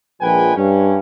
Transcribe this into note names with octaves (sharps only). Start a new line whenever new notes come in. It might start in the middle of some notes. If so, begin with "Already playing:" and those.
A#1 F3 G#3 B4 G5 G#5
G2 C#4